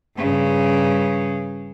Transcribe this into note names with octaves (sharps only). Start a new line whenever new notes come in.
G2 C#3